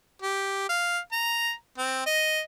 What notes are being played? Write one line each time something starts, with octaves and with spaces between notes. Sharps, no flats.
G4
F5
A#5
C4
D#5